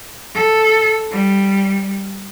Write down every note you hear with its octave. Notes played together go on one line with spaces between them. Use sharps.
A4
G3